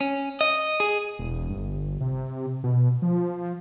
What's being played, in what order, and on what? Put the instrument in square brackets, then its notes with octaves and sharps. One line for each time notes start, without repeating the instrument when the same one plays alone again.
[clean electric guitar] C#4
D#5
G#4
[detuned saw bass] E1
G1
C3
B2
F3